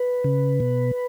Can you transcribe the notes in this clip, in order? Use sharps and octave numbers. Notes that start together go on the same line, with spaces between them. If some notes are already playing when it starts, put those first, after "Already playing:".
Already playing: B4
C#3
B2